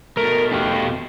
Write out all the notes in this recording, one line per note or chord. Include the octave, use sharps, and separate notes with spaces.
B2 A3 A#4
G4 F5